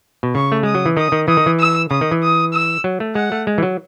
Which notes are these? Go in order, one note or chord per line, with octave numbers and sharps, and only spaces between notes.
B2
C#3 C#6
A3
G#3 D#6
F#3
E3
D#3 D#6
D#3
E3 D#6
D#3
E3
E6
C#3 D#6
D#3
E3
D#6
E6
F#3
A3
G#3 F#5
A3
G#3
E3
F#3